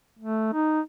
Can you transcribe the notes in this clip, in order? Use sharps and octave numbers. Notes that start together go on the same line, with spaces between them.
A3
D#4